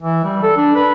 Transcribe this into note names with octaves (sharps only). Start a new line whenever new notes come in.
E3
G3
A4
D4
B4